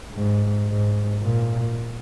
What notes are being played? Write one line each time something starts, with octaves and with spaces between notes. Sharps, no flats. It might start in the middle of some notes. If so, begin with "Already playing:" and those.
G#2
G#2
A#2